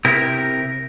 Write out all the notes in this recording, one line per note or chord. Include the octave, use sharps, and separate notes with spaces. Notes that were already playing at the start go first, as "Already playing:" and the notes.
C3 E4 G4 A#4